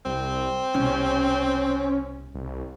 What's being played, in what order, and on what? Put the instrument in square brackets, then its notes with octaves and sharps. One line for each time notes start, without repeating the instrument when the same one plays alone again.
[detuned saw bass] C2 [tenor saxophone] C4
[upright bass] C2 B2 [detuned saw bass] C#4
[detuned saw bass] C2